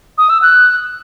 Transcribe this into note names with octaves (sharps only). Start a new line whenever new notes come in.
D#6
E6
F#6